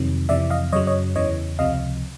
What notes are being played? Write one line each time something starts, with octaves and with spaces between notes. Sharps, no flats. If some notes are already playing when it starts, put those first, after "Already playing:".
Already playing: F2 C3 D#3 F#3
F2 C3 E3 D5 E5
D#5 F5
F#2 C#3 F#3 C#5 D#5
C#5 D#5
E2 C#3 E3 C#5 D#5
C#2 C3 F3 D#5 F5